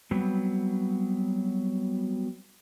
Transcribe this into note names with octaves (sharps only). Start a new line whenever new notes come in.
F#3 G3 B3 C4